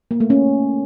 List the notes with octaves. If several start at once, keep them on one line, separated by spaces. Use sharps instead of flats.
A#3
A3
C#4